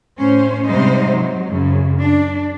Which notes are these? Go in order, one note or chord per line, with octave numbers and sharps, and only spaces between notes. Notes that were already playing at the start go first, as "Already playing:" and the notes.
A2 C#4 C5
G#2 C3 G3 D#4 C5 D#5
F#3
F#2 C#3
D4